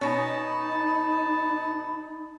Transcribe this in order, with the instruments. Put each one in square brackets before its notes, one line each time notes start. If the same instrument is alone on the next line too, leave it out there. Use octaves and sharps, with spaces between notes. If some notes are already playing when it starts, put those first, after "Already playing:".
[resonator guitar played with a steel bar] B2 C#4 [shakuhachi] D#4 [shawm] A5 [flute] B5